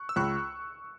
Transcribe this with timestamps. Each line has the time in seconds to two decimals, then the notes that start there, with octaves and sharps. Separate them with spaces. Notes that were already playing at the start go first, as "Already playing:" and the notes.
Already playing: C#6 F#6
0.09 E6
0.16 C#2 C#6 F#6